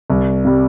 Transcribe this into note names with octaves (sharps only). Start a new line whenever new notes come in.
C2
C3 G3